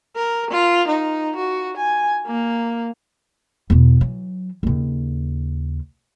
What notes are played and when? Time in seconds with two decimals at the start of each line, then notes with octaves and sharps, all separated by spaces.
0.16 A#4
0.51 F4
0.87 D#4
1.36 F#4
1.77 G#5
2.26 A#3
3.70 E2 B2
4.01 E3 F#3
4.63 D#2 C#3